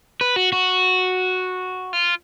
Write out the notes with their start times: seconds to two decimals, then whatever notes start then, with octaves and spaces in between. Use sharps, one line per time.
0.21 B4
0.36 F#4
0.53 F#4
1.93 F4